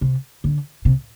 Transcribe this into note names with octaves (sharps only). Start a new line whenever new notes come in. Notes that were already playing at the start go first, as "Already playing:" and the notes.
C3
D3
C3